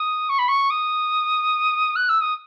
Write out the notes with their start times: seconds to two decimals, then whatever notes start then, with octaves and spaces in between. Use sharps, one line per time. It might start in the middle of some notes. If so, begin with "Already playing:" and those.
Already playing: D#6
0.29 C#6
0.38 B5
0.48 C#6
0.70 D#6
1.95 F#6
2.09 E6
2.20 D#6